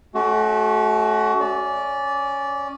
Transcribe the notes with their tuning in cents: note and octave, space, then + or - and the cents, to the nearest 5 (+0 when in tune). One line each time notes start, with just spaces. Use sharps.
A3 -30 C#4 +0 F#4 +20
C#4 +0 D5 -15